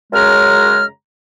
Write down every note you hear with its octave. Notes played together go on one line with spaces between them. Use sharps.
F#2 C#3 G#3 A#5 F6